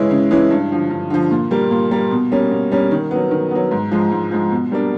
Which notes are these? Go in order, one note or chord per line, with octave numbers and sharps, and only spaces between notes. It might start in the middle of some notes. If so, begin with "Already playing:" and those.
Already playing: C#3 E3 G#3 C#4 E4
C#3
E3 G#3 C#4 E4
G2
D3 F3
G2
D3 F3
A#2
G3 A#3
A#2
G3 A#3
B2
G3 A#3 C#4
B2
G3 A#3 C#4
D#3
F#3 B3
D#3
F#3 B3
G#2
F3 G#3
G#2
F3 G#3
B2
G3 A#3 D4